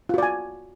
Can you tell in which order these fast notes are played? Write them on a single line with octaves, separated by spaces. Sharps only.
F4 F#4 D5 G#5